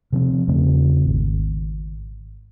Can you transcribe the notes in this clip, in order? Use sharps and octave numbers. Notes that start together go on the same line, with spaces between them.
C3 F3 C4
E2 C#3 A3 C4
G#1